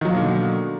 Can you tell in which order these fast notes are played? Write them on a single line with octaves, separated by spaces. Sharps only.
D#3 F#3 A#3 B2 D3